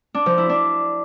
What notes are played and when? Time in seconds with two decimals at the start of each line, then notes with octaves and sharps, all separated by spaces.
0.14 D4
0.26 F3
0.38 E4
0.49 D4